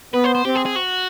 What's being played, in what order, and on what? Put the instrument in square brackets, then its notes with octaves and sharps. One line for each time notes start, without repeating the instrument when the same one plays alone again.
[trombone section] B3 [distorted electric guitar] B4
[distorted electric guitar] C5
C5
[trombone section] C4 [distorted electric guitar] G4
[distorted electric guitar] G#4
G#4
F#4